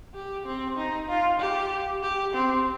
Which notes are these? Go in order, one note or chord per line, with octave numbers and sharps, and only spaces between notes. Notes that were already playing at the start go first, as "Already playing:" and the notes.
G4
C4
D#4
F4
G4
G4
C4